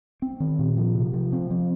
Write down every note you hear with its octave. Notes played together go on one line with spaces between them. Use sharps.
C4
D#3
A#2
F3
C3
F3
C4
F3